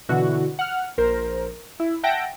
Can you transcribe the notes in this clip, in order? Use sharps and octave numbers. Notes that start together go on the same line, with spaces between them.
B2 D3 E3 E4 F#4
F#5 F6
A#1 A#4 C5
E4
E5 F#5 G5 A5 A#6 D7